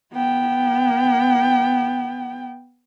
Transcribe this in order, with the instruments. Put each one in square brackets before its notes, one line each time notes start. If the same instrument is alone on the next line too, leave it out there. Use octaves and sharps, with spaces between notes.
[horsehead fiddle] B3 G5